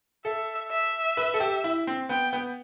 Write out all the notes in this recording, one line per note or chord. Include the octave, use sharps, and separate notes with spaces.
A4 E5
E5
B4
A4
G4
E4
C4
B3 G5
B3